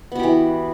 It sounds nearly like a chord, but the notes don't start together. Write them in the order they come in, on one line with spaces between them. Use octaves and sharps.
B3 F#4 G4 E3